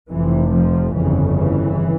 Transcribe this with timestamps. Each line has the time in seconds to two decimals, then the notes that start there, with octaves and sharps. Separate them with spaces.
0.11 F1 F2 C3 E3
0.53 F3
0.94 G1 F2 C#3 E3
1.36 E3